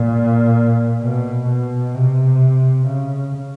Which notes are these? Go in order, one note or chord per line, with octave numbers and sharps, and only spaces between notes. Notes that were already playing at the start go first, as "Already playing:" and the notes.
Already playing: A#2
B2
B2
C3
C#3